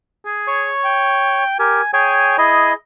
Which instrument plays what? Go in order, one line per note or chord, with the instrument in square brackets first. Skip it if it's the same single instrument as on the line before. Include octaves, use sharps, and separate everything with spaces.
[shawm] G#4
[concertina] C#5 C#6
[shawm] G5
[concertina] G4 A#4 [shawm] G#5
[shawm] G#4 [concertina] C#5 G5 G#5
[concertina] E4 D#5 [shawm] G#4